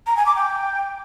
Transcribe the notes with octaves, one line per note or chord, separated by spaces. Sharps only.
A#5
G#5
D6
G5